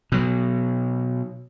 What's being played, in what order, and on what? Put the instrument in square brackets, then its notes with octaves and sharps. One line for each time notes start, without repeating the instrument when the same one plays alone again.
[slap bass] B2 F#3